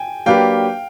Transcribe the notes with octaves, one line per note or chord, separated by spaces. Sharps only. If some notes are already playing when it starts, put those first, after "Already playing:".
Already playing: G5 G#5
F#3 A#3 D4 G4 B4 F5 G5